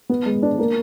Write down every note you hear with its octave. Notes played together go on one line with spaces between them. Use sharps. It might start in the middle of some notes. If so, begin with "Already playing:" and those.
B3
G#3
D4
A#3